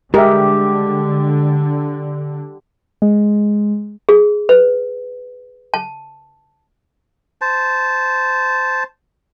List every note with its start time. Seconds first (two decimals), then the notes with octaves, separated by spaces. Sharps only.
0.14 D3 G#3 G4 A#4 E5
3.02 G#3
4.09 G#4
4.49 B4
5.74 A5
7.41 C5 A5